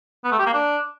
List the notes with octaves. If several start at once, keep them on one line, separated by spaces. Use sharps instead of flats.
B3
A3
G4
A#3
D4